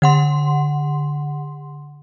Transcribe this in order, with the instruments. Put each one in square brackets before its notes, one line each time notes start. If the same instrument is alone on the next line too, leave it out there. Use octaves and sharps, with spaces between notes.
[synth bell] D3 F#5 C6